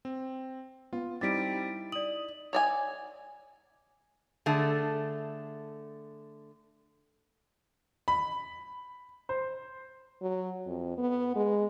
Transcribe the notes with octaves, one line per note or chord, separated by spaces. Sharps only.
C4
B3 F4
G3 C4 D#4 E4 D6 A6 B6 D7
D5 D#6 F#7
C#5 D5 G#5
D3 A3 G#4 A5
B5
C5
F#3
F2
B3
G#3